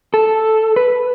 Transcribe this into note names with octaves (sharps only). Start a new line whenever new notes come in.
A4
B4